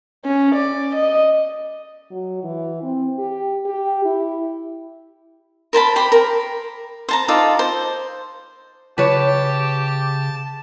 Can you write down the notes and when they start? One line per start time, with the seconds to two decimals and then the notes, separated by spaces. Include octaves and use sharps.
0.25 C#4
0.55 D5
0.95 D#5
2.11 F#3
2.44 E3
2.83 C4
3.18 G4
3.66 G4
4.05 E4
5.73 A#4 C5 A5 B5
5.96 G4 C5 B5
6.12 A#4
7.09 C5 A5 A#5
7.28 D#4 F4 A4 D5
7.59 C5
8.98 C#3 G4 B4 C#5 A5